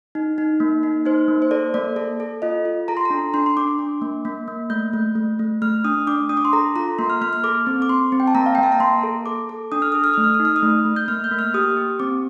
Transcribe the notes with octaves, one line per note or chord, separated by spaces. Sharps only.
D#4
D#4
A#3
D#4
D#4 C5
A#3
C5
A4 D5
A#3 D5
A4
A4
F4 D#5
F4
A4 A#5
C6
A#5
D4
D4 C6
C6
D4 D6
D4
A#3
A#3
A#3
A3 G6
A3
A3
A3
A3 F6
D4 D#6
D4 D6
D4 D#6
D6
C6
A4 A#5
F4 A#5
A#3 C6
F6
A#3 F6
F6
A4 D6
C4
D6
C4 C6
C4
G5
A5
A#3 A#5
F5
A#3 G5
A5
A#5
A#3 C6
A4
A4 D6
A4
D4 D#6
F6
A4 D#6
F6
A3 D#6
F6
D#6
D#4
F6
D#6
A3
A3
G6
A#3 F6
G6
A#3
F6
G4 D#6
G4
C4 D6